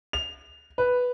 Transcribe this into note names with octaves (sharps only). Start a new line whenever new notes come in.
F7
B4